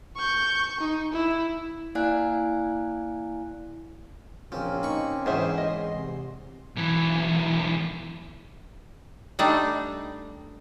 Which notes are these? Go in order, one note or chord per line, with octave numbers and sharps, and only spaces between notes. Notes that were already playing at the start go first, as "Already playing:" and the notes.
C#6 G6
D#4
E4
A#3 E4 D5 F5 G#5 F#6
A#1 F3 A#3 C4 C#4
D#4 B5 C#6
E2 G#2 G#3 G#4 C5 E5
D#5 C6
C3
B1 E3
G3 A3 D4 D#4